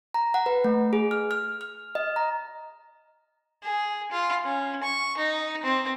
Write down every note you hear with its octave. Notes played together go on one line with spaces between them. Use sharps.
A#5
F#5
B4
A3
G#4
F6
F6
F6
D#5
A#5
G#4
F4
C#4
C#6
D#4
C4